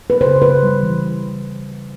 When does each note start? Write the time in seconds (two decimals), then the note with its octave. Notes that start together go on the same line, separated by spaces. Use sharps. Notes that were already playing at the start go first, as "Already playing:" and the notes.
0.10 B4
0.21 C#3 C5
0.42 C#3 B4
0.63 G3
0.83 E3